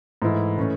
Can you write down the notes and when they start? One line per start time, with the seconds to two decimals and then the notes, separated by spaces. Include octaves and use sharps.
0.22 G#2 E3 A3 E4
0.58 C#3 E3 A3 C#4